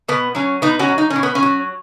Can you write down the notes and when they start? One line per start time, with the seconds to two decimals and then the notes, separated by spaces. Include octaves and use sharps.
0.08 B2 B3
0.35 F#3 C#4
0.62 B2 B3 D#4
0.79 C#4 F#4
0.88 F#3
0.98 D#4
1.10 C#4
1.16 B2
1.23 B3
1.35 C#4
1.43 F#3